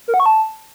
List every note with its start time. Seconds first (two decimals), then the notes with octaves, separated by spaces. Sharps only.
0.08 A#4
0.14 F#5
0.20 C#6
0.26 A5